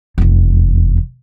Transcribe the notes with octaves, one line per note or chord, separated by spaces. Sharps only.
F1 E2